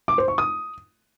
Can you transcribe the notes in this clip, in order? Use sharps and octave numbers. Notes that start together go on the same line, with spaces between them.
D6
C5
C#6
D#6